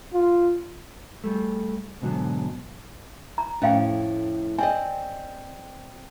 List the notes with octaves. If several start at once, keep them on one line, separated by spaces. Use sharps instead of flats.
F4
G3 A3
G#2 B2 D3 D#3 F#3
A#5
F2 A2 C#4 F5 G5
C4 D5 D#5 G#5